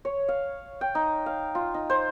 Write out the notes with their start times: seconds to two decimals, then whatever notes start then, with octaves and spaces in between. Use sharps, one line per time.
0.05 C#5
0.28 F5
0.81 G5
0.95 D#4
1.26 F5
1.55 F4
1.74 D#4
1.90 C5